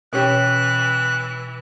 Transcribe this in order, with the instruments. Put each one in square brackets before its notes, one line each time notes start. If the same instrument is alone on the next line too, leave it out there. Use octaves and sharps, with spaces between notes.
[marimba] B2 [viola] E3 [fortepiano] C#4 G4 [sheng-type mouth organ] F#6